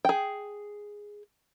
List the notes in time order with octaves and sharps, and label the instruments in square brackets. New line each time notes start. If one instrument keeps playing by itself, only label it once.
[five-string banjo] G#4 G5